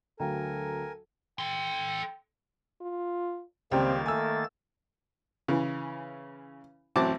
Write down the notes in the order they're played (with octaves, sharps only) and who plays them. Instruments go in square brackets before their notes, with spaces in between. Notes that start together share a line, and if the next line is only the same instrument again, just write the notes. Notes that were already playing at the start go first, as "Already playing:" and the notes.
[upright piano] D2 F#3 [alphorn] A4 [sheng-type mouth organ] A#4 G#5 [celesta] F5 G5 A#5
[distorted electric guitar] A4 C6 [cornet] G5
[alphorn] F4
[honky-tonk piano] C#2 G3 G5 [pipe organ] D#3 A#3 A6 [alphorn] C4
[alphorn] A3 [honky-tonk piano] G#5 E6
[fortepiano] C#3 E3
A1 F#3 C4 C5 A5 D6